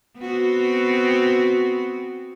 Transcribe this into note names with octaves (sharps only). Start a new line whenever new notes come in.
B3 C4 F#4